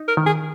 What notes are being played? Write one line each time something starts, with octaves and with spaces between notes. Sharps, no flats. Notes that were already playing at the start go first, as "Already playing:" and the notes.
Already playing: D#4
A#4
D#3
G#4